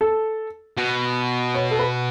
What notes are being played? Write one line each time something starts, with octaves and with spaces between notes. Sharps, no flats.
A4
B2
C#5
A4
B4